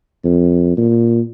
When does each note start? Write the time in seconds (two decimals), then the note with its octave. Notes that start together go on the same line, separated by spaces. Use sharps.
0.24 F2
0.78 A#2